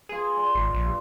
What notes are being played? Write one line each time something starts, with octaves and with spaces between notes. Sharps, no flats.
F4 G#4 B4
D5 C6
G#1
A#1
G2